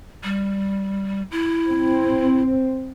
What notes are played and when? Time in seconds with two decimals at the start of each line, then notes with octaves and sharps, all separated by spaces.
0.24 G3
1.31 E4
1.71 C4